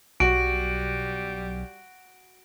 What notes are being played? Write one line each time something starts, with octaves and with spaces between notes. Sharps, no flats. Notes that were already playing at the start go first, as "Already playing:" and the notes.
B1 G3 F#4 D7